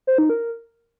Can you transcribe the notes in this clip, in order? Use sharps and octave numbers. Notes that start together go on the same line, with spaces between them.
C5
D#4
A#4